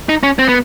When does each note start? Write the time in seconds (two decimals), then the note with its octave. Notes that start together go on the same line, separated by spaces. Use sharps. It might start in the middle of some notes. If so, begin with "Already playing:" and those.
0.09 D#4
0.23 C#4
0.39 C4
0.49 B3